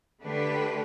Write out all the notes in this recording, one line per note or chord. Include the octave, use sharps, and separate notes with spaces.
D3 A3 D4 G4 B4